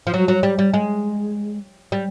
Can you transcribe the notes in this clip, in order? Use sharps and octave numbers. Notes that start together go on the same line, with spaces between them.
F3
F#3
F#3
G3
G3
G#3
G3